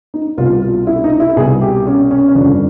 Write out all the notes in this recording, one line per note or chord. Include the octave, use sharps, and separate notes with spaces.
D#4
C2 B2 F4
F4
E4
D#4
E4
C2 B2 G#4
G4
C#4
C#4
C#4
G1 F2 D3 D4